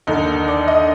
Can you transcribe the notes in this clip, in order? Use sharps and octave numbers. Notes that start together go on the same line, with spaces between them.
D#2 D3 D#4
D5
D#5